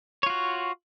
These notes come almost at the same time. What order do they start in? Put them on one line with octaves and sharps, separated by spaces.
C#5 F4 F#4